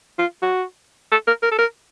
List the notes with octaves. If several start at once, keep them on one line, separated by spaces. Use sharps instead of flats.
F4
F#4
A4
A#4
A#4
A4
A#4